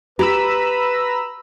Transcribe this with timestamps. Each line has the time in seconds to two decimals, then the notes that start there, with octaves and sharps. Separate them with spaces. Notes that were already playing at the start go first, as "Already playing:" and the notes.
0.19 G4 B4 A#5 B5 E6